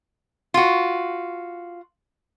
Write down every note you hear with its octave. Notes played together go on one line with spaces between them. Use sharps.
F4 F#4